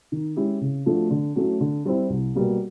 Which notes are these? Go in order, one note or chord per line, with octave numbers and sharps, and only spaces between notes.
D#3
G#3 C#4 E4 G4
C#3
F3 A3 D4 F#4
D3
F#3 A3 C#4 E4
D3
G3 C4 E4
C2
B2 G3 A#3